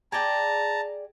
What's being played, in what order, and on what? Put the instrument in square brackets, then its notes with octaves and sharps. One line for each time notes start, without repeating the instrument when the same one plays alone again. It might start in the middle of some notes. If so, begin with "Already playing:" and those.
[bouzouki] G#4 D5 G5 [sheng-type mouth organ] A5 A#5